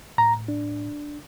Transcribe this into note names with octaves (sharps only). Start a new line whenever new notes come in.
A2 A#5
D4